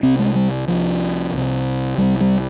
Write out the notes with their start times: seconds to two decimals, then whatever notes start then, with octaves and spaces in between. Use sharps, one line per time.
0.03 C2 C3 C4
0.19 G#3
0.35 G3
0.68 C2 C3 F3
1.33 C2 C3
1.98 C2 C3 G3
2.21 G3